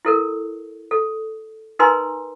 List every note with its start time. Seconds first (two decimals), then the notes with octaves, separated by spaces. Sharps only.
0.05 E4 A4 A#4
0.91 A4
1.79 D#4 A#4 B4 G#5 A#5 C6